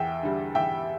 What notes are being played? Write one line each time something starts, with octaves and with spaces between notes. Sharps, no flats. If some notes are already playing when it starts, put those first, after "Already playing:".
Already playing: E2 E5 G5
D3 G3
E2 E5 G5